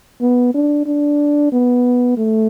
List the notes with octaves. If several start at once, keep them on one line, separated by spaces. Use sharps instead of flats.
B3
D4
D4
B3
A3